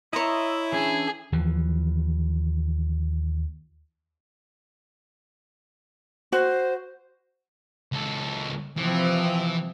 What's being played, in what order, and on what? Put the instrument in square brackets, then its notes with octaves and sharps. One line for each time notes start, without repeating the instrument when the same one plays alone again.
[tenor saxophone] E4 [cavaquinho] C#5 A#5 [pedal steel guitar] D#5 E5 C6
[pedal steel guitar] E3 C#4 D4 [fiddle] G#4
[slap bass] D#2 E3 F3
[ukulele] F#4 [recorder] C5
[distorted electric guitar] C#2 A4
[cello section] C3 F3 C4 [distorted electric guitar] E3